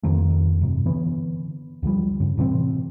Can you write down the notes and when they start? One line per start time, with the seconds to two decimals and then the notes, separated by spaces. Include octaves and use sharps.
0.03 D1 F2 D#3 A3
0.61 G2 C3
0.86 D3 E3 B3
1.83 D2 D3 F3 G3
2.20 G2 C#3
2.37 A2 C3 E3 C4